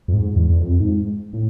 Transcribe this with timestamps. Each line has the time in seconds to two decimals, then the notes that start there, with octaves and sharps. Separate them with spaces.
0.08 F2
0.14 G#2
0.36 E2
0.50 E2
0.58 F2
0.80 G#2
1.33 A2